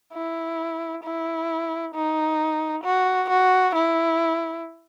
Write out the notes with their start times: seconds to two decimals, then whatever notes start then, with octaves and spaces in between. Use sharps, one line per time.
0.13 E4
1.03 E4
1.94 D#4
2.84 F#4
3.30 F#4
3.75 E4